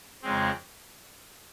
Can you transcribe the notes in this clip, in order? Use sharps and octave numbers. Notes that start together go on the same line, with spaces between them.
F2 C#3 G#3 C4